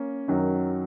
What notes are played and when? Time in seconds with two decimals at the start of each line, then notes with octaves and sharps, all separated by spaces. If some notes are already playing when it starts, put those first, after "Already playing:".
Already playing: A#3 C#4
0.28 F#2 D#3 F#3